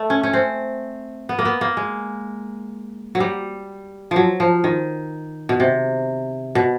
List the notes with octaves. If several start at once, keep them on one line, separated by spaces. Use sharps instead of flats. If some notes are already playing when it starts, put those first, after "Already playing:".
Already playing: A3
C#4
C#4
C4
B3
A#3
B3
A#3
G#3
F#3
G3
F3
F#3
F3
D#3
B2
C3
B2